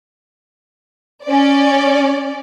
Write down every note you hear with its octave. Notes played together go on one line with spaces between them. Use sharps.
C#4 D5